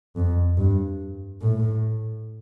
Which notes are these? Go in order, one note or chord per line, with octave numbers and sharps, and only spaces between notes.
F2
G2
A2